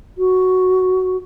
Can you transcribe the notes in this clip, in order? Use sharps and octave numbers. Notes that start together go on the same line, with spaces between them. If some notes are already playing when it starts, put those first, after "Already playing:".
F#4